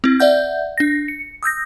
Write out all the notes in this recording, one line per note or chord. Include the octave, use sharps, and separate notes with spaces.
C4 E4
D5 E5 F#5 G6
D4 A#6
C#7
D#6 E6 G6 A#6